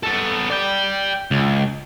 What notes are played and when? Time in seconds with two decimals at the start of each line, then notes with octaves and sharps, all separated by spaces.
0.03 B3 A4
0.51 D5 G5
1.31 C#2